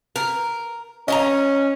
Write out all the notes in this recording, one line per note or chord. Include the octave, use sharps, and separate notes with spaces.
A#4
C#4 D#5 G#5 A#5